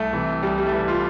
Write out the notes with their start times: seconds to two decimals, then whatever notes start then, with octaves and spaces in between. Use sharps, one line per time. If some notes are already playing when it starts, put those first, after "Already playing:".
Already playing: C2 A3
0.13 C3 E3
0.42 C2 G3
0.58 G3
0.67 A3
0.73 C3 E3 G3
0.88 F4